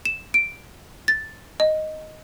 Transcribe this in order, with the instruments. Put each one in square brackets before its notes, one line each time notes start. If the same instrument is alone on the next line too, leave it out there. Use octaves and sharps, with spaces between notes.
[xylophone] E7
D7
A6
D#5